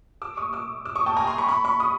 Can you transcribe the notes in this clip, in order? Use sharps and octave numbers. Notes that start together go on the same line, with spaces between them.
D6 E6
C#6 D#6
D6 E6
D6 E6
C#6 D#6
G5 A5
G#5 A#5
A#5 C6
B5 C#6
B5 C#6
B5 C#6
C#6 D#6